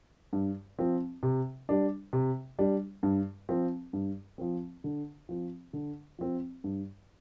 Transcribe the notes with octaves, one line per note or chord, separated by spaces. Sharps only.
G2
F3 C4
C3
G3 D4
C3
G3 D4
G2
F3 C4
G2
F3 C4
D3
F3 C4
D3
F3 C4
G2